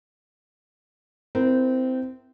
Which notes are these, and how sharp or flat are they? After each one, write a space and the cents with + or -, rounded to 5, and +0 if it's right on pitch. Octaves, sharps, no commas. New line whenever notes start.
C4 -20 E4 -5 A#4 +0